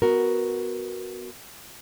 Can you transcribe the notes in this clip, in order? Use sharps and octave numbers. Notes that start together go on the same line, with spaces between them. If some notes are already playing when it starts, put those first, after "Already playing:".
B3 F#4 A#4